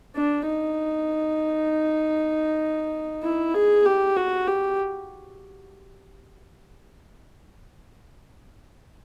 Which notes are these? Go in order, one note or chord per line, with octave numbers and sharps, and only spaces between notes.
D4
D#4
E4
G#4
G4
F#4
G4